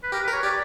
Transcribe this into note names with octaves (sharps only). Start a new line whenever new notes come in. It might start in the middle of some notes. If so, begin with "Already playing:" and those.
B4
G4 A#4
B4
A#4
C#5
G4 D5